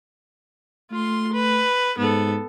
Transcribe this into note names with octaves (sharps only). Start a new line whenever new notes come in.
A3 F4 C6
B4
G#2 B3 A4